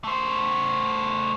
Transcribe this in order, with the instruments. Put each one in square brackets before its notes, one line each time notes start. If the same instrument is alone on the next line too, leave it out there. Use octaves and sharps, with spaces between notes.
[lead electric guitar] A3 C5